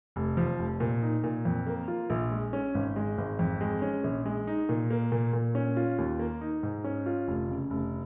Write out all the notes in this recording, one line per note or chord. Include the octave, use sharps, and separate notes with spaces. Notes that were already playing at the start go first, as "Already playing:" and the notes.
F1
F3
F1
A#2
D#4
A#2
F2
A#3
F4
A#1
G#3
C#4
G#1
G#3
G#1
F2
G#3
C#4
A#1
G#3
D#4
A#2
A#3
A#2
A#2
C#4
F4
D#2
A#3
D#4
G#2
C#4
F4
F1
C#3
F1